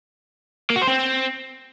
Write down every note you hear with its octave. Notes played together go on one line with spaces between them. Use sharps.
A#3
F#4
C5
C4